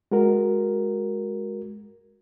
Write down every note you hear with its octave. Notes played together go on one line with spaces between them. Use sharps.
G#3 F#4 A#4